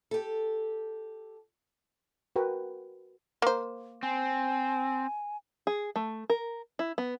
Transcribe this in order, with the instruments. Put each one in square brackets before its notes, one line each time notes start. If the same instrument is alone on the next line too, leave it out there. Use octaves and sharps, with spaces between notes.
[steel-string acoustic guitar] G4 A4
[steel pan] F#4 A#4 B4 G5
[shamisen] A#3 C5
[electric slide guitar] C4 [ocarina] G#5
[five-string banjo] G#4
A3
A#4
E4
B3